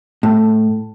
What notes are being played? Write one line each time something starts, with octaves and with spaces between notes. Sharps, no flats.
A2